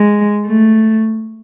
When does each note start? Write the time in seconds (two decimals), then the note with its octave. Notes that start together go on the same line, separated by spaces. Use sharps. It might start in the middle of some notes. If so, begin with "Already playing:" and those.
Already playing: G#3
0.46 A3